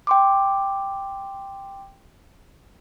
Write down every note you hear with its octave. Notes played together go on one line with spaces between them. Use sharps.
G5 C6 D6